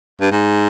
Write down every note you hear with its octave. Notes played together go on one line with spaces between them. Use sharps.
G2
G#2